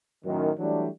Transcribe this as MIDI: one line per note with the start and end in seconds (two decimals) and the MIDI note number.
0.25 0.50 42
0.25 0.50 45
0.25 0.50 51
0.58 0.87 52
0.58 0.87 54
0.58 0.87 55
0.58 0.87 57
0.58 0.87 62